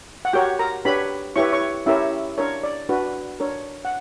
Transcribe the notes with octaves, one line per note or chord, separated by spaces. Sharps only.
F#5
F#4 G4 A#4 C#5 G5
A#4 A#5
D4 G4 B4 C#5 B5
E4 G4 B4 C#5 C#6
C#5 C#6
C#4 E4 G4 A#4 C#5 E5
D4 A#4 C#5
D5
D4 F#4 B4
D4 A#4 C#5
F#5